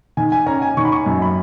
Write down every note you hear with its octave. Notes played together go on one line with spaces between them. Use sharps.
D#3 G#5
G#5
C#4 A#5
G#5
D#3 C#6
B5
C#6
F#2
B5